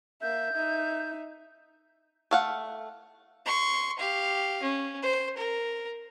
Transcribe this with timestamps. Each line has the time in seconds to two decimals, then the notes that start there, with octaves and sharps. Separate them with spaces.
0.22 A#3 E5 G6
0.54 D#4 E5
2.31 A3 F5 F#5
3.46 C6 C#6
3.99 G4 F5
4.62 C#4
5.03 C5
5.37 A#4